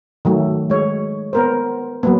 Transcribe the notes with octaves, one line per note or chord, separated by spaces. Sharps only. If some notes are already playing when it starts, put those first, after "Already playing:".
D#3 F#3 A3
G#3 C#5
B3 A#4 C5
F#3 A#3 B3